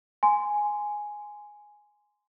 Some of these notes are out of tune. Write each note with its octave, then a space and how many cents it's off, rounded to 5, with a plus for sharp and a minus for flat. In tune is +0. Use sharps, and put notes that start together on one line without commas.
G#5 +0 C6 -15